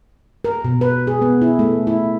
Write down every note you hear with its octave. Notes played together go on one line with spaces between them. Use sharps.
A#4
B2
B4
G#4
B3
E4
A3
E4